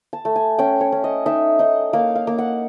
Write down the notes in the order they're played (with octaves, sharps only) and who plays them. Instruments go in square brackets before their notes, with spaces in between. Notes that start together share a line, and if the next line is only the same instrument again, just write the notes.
[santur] A5
A3
G#5
C#4 G5
C#5
C#4
D#5
D#4 E5
D#4 D#5
A#3 F5
F5
A#3
F#5